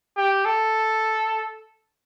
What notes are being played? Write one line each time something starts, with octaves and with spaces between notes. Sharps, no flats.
G4
A4